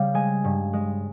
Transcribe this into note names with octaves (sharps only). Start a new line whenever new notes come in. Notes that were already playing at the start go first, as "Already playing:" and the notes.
Already playing: C#3 G3 F5
G#3 G#5
G2
G#3